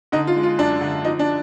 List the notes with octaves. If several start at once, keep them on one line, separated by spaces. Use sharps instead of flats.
D3 D#4
F4
G#3
F4
F#2 D4
D3
F3 D#4
D4